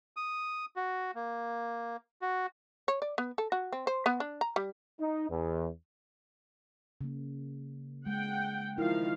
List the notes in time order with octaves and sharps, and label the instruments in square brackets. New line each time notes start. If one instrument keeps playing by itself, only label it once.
[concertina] D#6
F#4
A#3
F#4
[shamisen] C#5
D5
B3
A4
F#4
C4
C5
B3
D4
A#5
G3
[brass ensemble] D#4
E2
[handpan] C#3 A#3
[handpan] G#3 [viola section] F#5 G5
[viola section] D#3 F3 F5 [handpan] E4